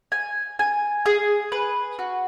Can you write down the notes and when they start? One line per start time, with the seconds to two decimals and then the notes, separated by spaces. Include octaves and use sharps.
0.12 G#5
0.59 G#5
1.06 G#4
1.52 B4
1.99 F#4